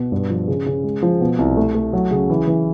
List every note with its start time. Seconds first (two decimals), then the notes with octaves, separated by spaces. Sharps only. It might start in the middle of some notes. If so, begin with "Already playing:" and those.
Already playing: B2
0.12 G2
0.30 F3
0.48 C#3
0.66 C#3
0.84 G#3
1.03 F3
1.21 B2
1.39 C2
1.57 A3
1.75 A3
1.93 F#3
2.11 C#3
2.30 E3
2.47 E3